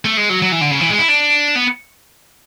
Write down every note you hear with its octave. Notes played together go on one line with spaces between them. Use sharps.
A3
G#3
F#3
F#3
E3
D3
C#3
E3
G#3
E4
D4
B3